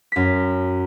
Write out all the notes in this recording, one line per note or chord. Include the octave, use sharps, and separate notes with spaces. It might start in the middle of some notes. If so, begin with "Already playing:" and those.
F#2 B6